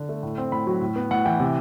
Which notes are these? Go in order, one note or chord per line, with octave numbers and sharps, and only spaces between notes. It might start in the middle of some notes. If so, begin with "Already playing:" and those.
Already playing: D3
A3
A2
C4
A2 B5
F#3
A2
B3
A2 F#5
E3 G5
C3